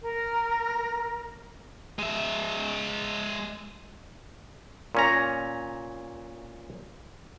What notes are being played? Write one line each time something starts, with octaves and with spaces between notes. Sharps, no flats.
A#4
G#3 E5
A#2 C#4 A#5